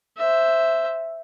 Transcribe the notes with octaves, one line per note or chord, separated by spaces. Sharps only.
C5 E5